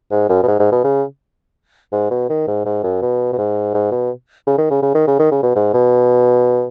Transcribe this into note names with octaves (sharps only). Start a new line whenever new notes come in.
G#2
F#2
B2
G#2
G#2
B2
C#3
G#2
B2
D#3
G#2
G#2
F#2
B2
B2
G#2
G#2
B2
C#3
D#3
C#3
C#3
D#3
C#3
D#3
C#3
B2
G#2
B2